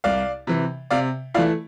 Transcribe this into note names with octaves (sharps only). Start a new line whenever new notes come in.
C2 D5 F5
C3 E3
C3 D5 F5
E3 A3 E4 D5 F5